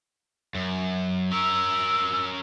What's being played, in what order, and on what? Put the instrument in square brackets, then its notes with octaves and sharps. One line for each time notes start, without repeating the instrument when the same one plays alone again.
[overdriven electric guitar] F#2
[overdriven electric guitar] C#4 A#4 [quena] E6